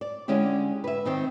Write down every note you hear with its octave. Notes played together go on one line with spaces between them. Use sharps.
D5
D3 G#3 C#4 E4 G4
B4 E5
D#3 C4 D#4